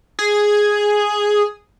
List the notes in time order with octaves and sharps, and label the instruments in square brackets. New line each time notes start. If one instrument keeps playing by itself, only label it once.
[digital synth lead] G#4